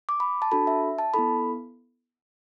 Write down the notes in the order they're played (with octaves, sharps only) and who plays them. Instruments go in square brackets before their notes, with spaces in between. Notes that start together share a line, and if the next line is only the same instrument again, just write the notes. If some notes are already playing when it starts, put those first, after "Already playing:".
[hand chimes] D6
B5
A5
D4 F#4 A4 B5
E5
A5
B3 E4 A4 B5